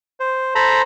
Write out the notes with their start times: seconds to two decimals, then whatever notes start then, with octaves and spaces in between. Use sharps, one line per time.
0.20 C5
0.55 A4 C5 A#5 B5